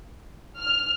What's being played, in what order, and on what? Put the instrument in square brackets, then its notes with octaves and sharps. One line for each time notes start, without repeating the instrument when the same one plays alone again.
[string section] F6